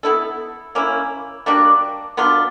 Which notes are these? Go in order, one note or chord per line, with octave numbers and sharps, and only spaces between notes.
B3 E4 A4
A#3 C#4 E4
G3 A#3 D4 F#4
F#3 B3 D4 F4